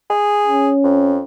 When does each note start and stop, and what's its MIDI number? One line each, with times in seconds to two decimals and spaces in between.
0.10 0.71 68
0.47 1.23 61
0.84 1.21 41